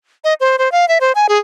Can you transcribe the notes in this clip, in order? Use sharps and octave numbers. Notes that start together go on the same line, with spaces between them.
D#5
C5
C5
F5
E5
C5
G#5
G#4